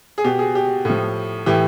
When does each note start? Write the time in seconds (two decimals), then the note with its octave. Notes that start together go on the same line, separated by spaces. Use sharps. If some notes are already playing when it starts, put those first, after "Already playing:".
0.18 G#4
0.24 B2 G4
0.39 G#4
0.55 G4
0.85 A2 F3
1.46 A2 E3 G4